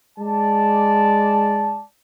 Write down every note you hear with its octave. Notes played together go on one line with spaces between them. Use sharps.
G#3 D5 A5